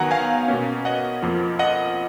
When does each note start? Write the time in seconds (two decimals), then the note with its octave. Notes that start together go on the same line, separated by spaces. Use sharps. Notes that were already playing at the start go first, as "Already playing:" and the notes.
Already playing: D#3 F#3 B3 F#5 G#5 A#5
0.11 F5 G#5
0.48 B2 A#3 C#4
0.85 D#5 F#5
1.22 F2 F3 A#3
1.59 D#5 F#5